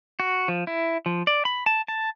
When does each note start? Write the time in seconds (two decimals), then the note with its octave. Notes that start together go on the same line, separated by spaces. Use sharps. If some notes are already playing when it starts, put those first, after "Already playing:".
0.20 F#4
0.48 F3
0.67 E4
1.06 F3
1.27 D5
1.45 B5
1.66 A5
1.88 A5